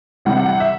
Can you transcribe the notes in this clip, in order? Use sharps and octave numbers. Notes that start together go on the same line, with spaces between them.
C3 E3 G3 F#5
F#5
F#5
E5